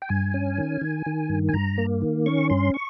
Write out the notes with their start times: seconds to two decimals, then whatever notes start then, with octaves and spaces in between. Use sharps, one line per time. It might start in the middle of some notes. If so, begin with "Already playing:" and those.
0.02 G5
0.09 G2 G#5
0.34 C#4
0.58 D#3
0.81 D#3
1.06 D#3
1.29 G2
1.49 G#5
1.53 G2 A#5
1.78 A#3
2.02 D#3
2.26 C#4 C#6
2.50 G2 C6
2.74 C#6